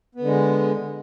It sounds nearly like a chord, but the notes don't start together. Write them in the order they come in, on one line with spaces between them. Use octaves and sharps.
B3 D3 G#3